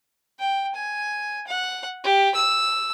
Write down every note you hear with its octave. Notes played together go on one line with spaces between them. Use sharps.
G5
G#5
F#5
G4
E6